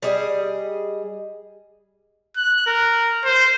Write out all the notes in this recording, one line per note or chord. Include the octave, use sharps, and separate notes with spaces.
G3 G#4 D#5
F#6
A#4
C5